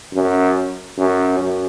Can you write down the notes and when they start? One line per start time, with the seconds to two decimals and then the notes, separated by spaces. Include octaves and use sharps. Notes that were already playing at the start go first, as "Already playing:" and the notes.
0.14 F#2
0.98 F#2
1.39 F#2